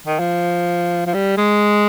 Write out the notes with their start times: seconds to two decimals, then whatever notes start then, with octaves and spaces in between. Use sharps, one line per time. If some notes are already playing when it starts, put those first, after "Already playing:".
0.07 D#3
0.19 F3
1.06 F3
1.14 G3
1.38 G#3